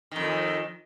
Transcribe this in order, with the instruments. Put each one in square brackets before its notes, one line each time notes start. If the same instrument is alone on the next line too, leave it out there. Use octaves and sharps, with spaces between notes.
[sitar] F2 D#3